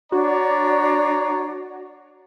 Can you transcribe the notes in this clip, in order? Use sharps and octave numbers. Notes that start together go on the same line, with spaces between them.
D4 F#4 C#5 D5 A#5